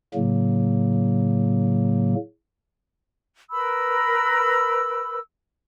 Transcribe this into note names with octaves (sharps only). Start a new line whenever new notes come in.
A2 C#3 F#3 A#3
A#4 B4 B5 E6